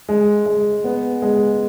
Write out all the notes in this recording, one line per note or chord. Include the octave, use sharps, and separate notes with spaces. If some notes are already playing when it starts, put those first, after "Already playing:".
G#3
G#3
B3
G#3